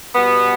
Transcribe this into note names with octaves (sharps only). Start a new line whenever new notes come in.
B2 G3 B3